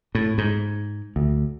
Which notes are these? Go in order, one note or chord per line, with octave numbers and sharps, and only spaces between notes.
A2
G#2
D2